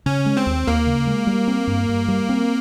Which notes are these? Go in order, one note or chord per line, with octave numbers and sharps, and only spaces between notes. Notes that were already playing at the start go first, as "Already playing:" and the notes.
C#3 C#4
G#3
C4
D#2
D#2 A#3
C#3
G#3
G3
C4
G2
G2
G3
C4